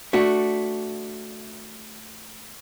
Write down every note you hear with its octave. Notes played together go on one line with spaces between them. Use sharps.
A3 D4 F#4